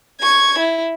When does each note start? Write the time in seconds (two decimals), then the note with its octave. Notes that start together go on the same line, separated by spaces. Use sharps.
0.21 C#6 G#6
0.59 E4